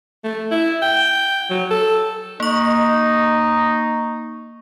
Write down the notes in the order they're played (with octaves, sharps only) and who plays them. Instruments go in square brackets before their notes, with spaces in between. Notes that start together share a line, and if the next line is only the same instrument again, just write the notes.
[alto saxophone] A3
E4
G5
F#3
A4
[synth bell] A#3 C#6 [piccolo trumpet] D#4